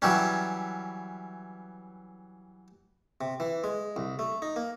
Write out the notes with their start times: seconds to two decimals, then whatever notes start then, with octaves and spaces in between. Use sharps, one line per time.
0.02 E3 F#3 G3 C#4
3.21 C3
3.40 E3
3.64 G#3
3.96 C2
4.19 A3
4.42 D#4
4.56 A#3